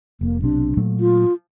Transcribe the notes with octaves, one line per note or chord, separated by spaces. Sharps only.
F1 A#3
B1 C3 D4
A#2 F#3 A3
F4